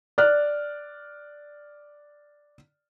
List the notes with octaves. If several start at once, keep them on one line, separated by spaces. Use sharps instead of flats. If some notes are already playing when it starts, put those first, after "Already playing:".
D5 F6 F#6